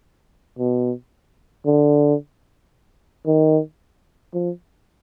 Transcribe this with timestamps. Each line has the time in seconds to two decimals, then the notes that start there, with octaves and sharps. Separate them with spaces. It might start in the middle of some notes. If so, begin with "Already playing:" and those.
0.59 B2
1.66 D3
3.27 D#3
4.34 F3